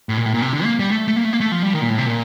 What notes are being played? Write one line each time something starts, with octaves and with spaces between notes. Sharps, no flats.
A2
A#2
A2
A#2
C3
D3
A#3
G3
A3
A3
A#3
A3
A#3
A3
F3
G3
D#3
A#2
A2
C3
A#2